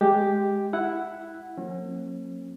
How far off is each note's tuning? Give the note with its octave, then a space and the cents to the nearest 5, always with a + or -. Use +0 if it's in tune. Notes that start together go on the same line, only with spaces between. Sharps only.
G#3 +0 G4 +0
E4 +0 F#5 +0
F3 +45 A#3 -20 C#4 -45